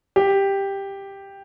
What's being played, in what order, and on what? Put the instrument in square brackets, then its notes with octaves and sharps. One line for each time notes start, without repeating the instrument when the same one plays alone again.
[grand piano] G4